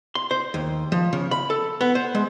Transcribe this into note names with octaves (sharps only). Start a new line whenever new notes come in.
C6
C5
D#2
F3
C#3
B5
A4
B3
C5
G#3